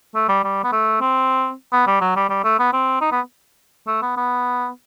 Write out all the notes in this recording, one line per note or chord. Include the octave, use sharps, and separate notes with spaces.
A3
G3
G3
B3
A3
C4
B3
G3
F#3
G3
G3
A3
B3
C4
D#4
B3
A3
B3
B3